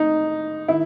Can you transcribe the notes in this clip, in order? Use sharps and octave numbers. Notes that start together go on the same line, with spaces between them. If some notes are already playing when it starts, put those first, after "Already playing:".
Already playing: A2 D#4
D#3 E4